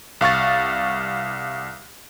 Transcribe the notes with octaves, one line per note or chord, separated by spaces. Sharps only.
C2 F5 C#6 A6